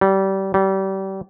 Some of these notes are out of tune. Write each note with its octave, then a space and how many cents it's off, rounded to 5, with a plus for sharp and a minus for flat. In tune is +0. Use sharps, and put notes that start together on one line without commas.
G3 -25
G3 -30